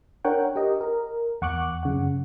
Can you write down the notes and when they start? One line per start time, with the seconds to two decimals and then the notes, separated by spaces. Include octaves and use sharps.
0.25 D4 A#4 C#5 F#5 G5
0.56 G4 A#4 D#5
0.81 A#4
1.41 E2 F#5 C#6 D6 F#6
1.83 F#2 C#3 F#5